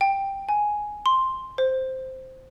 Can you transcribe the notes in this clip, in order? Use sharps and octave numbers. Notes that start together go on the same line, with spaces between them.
G5
G#5
C6
C5